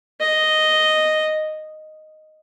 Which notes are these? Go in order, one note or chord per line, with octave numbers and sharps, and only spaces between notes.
D#5